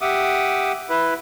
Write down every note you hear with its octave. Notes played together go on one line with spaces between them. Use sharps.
G4 E5 F#5 D6 D#6
E4 B4